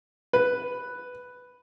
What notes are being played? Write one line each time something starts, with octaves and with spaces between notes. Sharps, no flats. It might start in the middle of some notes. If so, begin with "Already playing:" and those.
B4